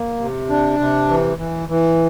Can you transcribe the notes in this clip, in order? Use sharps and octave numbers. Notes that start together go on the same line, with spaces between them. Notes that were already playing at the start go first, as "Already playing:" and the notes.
Already playing: A#3
C3
D4
C3
E3
E3
E3